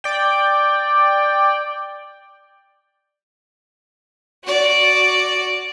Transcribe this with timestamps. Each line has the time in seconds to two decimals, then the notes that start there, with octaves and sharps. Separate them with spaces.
0.04 D5 G5
4.44 F#4 D5